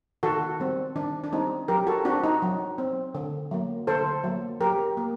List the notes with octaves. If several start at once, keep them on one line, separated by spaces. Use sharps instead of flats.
D#3 F#4 A4
G3 C4
D#3 D4
D4
G3 C4 D#4
F#3 G4 A#4
F#4 A4
C4 D4 F#4
D#4
F#3
C4
D3
F#3 A#3
D3 A4 C5
F#3 A#3
F#3 G4 A#4
A#3